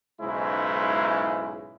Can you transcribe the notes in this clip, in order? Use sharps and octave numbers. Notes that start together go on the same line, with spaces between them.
B1 G#2 C#3 G#3 E4